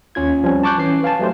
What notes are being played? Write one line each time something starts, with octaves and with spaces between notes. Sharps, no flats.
D#2 C#4 F4 G#6
F3 G3 C4 C#4
A5 C#6 D6 F#6 G6
E3 C#4 C7
B4 F5 G#5 A5
F#3 A3 G4 C5